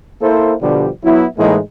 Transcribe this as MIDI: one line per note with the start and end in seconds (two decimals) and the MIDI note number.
0.21 0.54 58
0.21 0.54 64
0.21 0.54 69
0.21 0.54 72
0.60 0.87 47
0.60 0.87 50
0.60 0.87 53
0.60 0.87 55
1.03 1.25 54
1.03 1.25 59
1.03 1.25 64
1.37 1.57 45
1.37 1.57 52
1.37 1.57 56
1.37 1.57 58
1.37 1.57 63